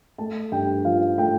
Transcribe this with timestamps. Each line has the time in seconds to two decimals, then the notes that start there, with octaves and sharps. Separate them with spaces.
0.18 A3 A5
0.52 G2 G5
0.85 F3 F5
1.18 A3 G5